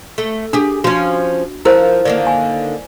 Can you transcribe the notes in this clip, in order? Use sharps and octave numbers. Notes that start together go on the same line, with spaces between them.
A3
D4 G4 G#4
F3 C#4 F#4
F3 E4 A#4 C5
D3 D#3 A#3 D5
G#5